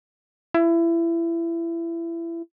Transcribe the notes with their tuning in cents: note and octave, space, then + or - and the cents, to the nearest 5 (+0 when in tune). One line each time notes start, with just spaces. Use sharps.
E4 +25